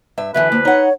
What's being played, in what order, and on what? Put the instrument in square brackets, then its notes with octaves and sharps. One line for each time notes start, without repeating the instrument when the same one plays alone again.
[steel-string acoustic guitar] G2 E5
[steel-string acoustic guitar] F#2 D3 E3 [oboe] B4 [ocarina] E5
[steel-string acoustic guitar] D2 [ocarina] A#3
[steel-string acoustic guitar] D#4 F#5 [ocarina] C#5